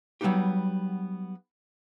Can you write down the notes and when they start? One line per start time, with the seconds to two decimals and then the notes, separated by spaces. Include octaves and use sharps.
0.21 F#3 G3 B3 C4 D#4 G4